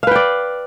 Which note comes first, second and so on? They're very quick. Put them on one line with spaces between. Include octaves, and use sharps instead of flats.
F5 B4 G5 D5